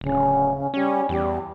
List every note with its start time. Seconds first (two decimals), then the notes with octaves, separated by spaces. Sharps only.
0.01 D1 C#3
0.74 G3 C#4
1.09 E2 G3